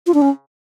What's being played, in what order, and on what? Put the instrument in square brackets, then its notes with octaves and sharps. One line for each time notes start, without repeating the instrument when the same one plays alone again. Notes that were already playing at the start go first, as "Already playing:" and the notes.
[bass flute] F4
D4
C#4